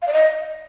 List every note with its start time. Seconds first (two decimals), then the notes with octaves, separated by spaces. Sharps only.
0.02 F5
0.07 D5
0.13 D#5